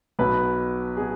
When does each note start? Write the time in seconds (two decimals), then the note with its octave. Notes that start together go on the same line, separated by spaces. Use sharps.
0.19 B1 B2 B4
0.97 B2 G#4